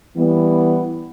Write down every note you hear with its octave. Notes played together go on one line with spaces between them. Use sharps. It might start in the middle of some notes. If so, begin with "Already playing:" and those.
E3 G3 B3